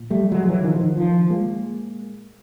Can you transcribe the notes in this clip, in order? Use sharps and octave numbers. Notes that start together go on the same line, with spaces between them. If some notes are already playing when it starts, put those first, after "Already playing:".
Already playing: A#2
G3 A3
F#3 G#3
E3 F#3
D#3 F3
D#3
D#3 F3
G#3 A#3